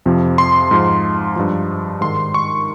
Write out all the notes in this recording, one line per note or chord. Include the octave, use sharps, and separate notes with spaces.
F2 C3 F3
C6
G#2 F3
G2 F3
G#2 D#3 C6
C#6